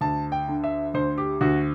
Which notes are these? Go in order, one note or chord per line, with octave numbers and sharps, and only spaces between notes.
D2 A5
G5
D3
E5
D2 C5
G4
D2 F#4